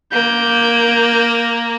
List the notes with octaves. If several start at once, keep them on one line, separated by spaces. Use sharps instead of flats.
A#3 G6